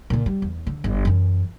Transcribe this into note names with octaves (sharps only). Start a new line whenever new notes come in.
A#2 D3
G3
E2
D3
G1
F#2 E3